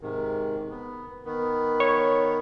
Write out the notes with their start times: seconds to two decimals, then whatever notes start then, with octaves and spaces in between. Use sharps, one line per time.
0.01 G#2 C3 D#3
0.70 B3
1.25 D#3 B3
1.80 C#5